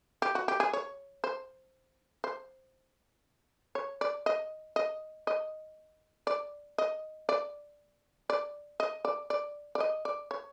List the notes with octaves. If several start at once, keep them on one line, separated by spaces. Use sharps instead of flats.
G4
F#4
G4
G#4
C#5
C5
C5
C#5
D5
D#5
D#5
D#5
D5
D#5
D5
D5
D#5
D5
D5
D5
D#5
D5
C#5